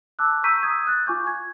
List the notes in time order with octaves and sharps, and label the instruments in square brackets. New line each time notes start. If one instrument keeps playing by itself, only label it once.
[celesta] A5 D6 E6 F#6
A#5 C#6 E6 G6 B6 D#7
D#6 G6 G#6
F#6 A6
F4 G#5 C#6 D6 G6
G#6